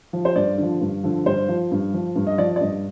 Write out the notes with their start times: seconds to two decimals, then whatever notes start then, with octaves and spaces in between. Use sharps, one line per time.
0.13 F3
0.25 C5
0.35 G2 D5
0.58 D3 F3
0.81 G2
1.04 D3 F3
1.25 G2 C5
1.49 F3
1.71 G2
1.94 F3
2.16 G2
2.27 D#5
2.38 F3 D5
2.56 D5
2.61 G2 D#5